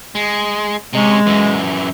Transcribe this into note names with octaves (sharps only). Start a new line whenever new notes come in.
G#3
C3 G#3 C#4
F#2 E3